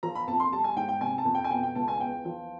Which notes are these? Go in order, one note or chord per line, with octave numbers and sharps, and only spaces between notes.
F3 A#5
B5
F2 A5
C6
G3 A5
G#5
G#2 G5
G5
C3 G#5
A5
F2
G5
G#5
B2 G5
G5
C#2 A5
G#5
E2 G5
F3